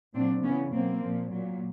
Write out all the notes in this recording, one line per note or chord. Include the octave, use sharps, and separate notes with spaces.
A#2 F#3 C4 D4
C#3 B3 C#4
E3
B2 F#3 A#3 C4
A#2 F3
A#2 F#3